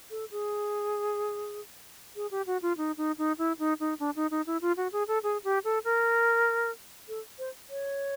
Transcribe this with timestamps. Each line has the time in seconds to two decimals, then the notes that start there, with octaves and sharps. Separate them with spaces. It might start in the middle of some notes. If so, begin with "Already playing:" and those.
0.11 A4
0.31 G#4
2.16 G#4
2.31 G4
2.47 F#4
2.62 F4
2.77 D#4
2.97 D#4
3.18 D#4
3.38 E4
3.59 D#4
3.80 D#4
4.00 D4
4.16 D#4
4.31 D#4
4.47 E4
4.61 F4
4.77 F#4
4.92 G#4
5.08 A4
5.23 G#4
5.44 G4
5.64 A4
5.85 A#4
7.08 A4
7.39 C5
7.70 C#5